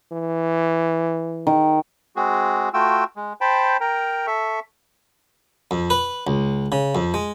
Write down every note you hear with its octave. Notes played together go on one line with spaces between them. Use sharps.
E3
D#3
G#3 C4 F#4 G#4
A3 F4 F#4 G5 E6
G#3
C5 G5 A5 B5
A#4 G5 A#5
A4 E5 C#6
F2
B4
C#2
C#3
F2
G#3